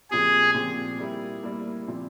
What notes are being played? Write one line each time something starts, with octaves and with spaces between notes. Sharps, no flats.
A#2 F3 C4 G4 G#4
A#2 F3 C4 G4
G3 A#3 E4 G4
G3 A#3 E4 G4
A#2 F3 C4